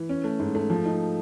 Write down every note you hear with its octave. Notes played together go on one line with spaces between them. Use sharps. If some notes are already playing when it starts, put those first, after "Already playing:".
Already playing: E3
C#4
A3
G#2
A3
F3
D#4